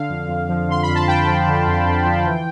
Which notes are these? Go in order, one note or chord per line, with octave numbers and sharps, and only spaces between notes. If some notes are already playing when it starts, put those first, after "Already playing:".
Already playing: D3 F5
F2
F2
F3
D3 C6
B5
F2
A5
F2 G5
F3
D3
F2
F2
F3
E3